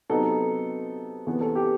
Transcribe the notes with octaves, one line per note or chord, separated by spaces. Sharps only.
C3 F#3 B3 D#4 A4
E2 C3 E3 B3
A4
G4